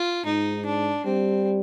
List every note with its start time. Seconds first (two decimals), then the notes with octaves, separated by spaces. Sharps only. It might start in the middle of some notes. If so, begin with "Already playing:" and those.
Already playing: F4
0.25 G#2 D#4
0.65 D4
1.05 G3 C4